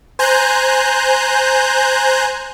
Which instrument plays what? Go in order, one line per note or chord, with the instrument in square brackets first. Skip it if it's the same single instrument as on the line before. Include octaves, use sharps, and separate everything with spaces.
[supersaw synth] C5 G#5 A#5 F#6 G6